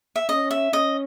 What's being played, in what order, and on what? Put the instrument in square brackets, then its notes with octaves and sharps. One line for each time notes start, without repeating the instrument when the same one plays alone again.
[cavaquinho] E5
[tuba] C#4 [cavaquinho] D#5
[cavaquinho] E5
[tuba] C#4 [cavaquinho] D#5